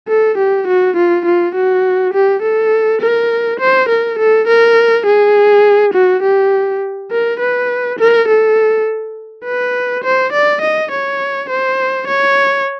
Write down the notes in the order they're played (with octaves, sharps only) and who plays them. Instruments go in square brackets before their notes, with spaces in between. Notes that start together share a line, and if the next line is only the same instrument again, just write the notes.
[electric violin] A4
G4
F#4
F4
F4
F#4
G4
A4
A#4
C5
A#4
A4
A#4
G#4
F#4
G4
A#4
B4
A#4
A4
B4
C5
D5
D#5
C#5
C5
C#5